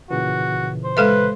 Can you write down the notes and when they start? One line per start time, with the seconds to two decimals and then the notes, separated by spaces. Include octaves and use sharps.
0.11 A#2 C#3 E3 F#4
0.84 C5
0.97 G#3 A4 B4 E5